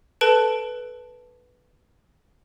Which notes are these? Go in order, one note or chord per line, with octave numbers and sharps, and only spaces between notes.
A4 B4 A5 D7